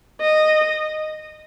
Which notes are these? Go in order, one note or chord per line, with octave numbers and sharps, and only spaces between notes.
D#5